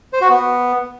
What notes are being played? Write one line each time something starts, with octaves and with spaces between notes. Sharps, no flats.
C5
F#4
B3